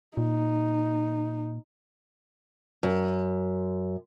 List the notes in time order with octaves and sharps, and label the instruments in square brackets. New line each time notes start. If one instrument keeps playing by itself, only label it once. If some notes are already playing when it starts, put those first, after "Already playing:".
[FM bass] A#2 [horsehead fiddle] D#4
[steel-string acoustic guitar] F#2